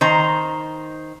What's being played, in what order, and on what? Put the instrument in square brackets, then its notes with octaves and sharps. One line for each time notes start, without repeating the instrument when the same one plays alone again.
[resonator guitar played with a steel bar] D#3 C5 A#5